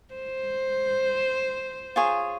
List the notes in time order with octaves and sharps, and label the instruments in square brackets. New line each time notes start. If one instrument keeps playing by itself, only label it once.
[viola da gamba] C5
[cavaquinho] F4 G#4 C#5